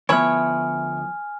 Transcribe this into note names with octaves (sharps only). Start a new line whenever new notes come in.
D2 F3 B3 E4 C#5 G#5 F6